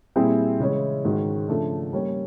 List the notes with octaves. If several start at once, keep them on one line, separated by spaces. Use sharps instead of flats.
A#2 G3 C4 E4 G#4
C#3 E3 G#3 C#4 E4
G#2 D#3 G#3 C#4 F#4
C#3 F3 A3 D4
G3 A#3 C#4